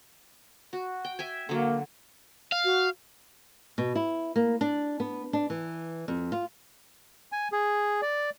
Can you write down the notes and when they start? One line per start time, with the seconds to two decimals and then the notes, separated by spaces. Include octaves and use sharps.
0.73 F#4
1.05 G5
1.19 E5 G5 G#5
1.49 D3 F#3 A#3
2.52 F5
2.65 F#4
3.78 B2
3.95 E4
4.36 A#3
4.61 D4
5.00 B3
5.33 D4
5.50 E3
6.08 F2
6.32 F4
7.32 G#5
7.52 G#4
8.02 D5